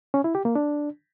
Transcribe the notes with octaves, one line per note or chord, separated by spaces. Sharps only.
C#4
E4
G4
A#3
D4